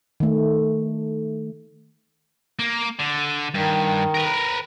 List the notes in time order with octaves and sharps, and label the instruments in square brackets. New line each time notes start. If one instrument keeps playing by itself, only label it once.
[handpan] D#3 A3
[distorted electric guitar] A#3
D3
[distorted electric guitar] G2 [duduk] D#3
[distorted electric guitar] A#4 B4